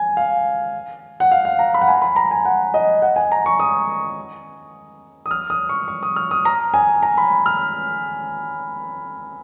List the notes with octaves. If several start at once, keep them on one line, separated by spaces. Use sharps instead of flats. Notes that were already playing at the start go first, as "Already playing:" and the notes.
Already playing: G#5
F5
F#5
F5
F5
A#5
B5
F#5
G#5
B5
A#5
G#5
F#5
D#5
F#5
G#5
A#5
C#6
D#6
D#6
F6
D#6
C#6
C#6
D#6
F6
D#6
A#5
G#5
A#5
B5
F6